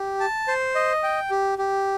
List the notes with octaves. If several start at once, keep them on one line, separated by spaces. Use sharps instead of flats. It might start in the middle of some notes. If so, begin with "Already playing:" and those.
Already playing: G4
A5
C5
D#5
G5
G4
G4